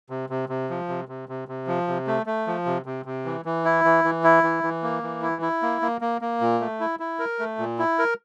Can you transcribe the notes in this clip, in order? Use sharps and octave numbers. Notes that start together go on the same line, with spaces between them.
C3
C3
C3
F3
C3
C3
C3
C3
F3
C3
A3
A3
F3
C3
C3
C3
E3
E3
E4
E3
E3
E4
E3
E3
A#3
E3
E4
E4
A#3
A#3
A#3
A#3
A#2
A3
E4
E4
A#4
A3
A#2
E4
A#4